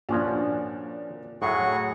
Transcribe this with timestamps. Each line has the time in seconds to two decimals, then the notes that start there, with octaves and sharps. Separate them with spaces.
0.09 A#2 F3 C#4 D4 F#4
1.42 A2 F#3 F#4 G#4 F#5 C#6